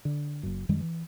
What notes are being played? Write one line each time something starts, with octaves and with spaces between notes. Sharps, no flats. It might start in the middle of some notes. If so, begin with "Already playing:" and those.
D3
F#1 F#2
F#2 D#3 G3 G#3
E3